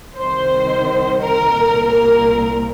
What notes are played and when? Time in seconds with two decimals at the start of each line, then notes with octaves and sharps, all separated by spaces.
0.16 C2 C3 D#3 C5
1.20 A#4
1.54 C2 A#2
1.88 A#4